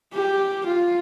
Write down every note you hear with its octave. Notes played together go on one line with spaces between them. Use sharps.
G4
F4